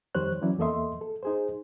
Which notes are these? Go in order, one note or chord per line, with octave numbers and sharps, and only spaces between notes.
F2 D#3 G3 C5 C#5 F#6
E3 F#3 C#4 E4 D5
E2 A#3 A4 D#5 E5 C6
A4
D#4 G#4 C5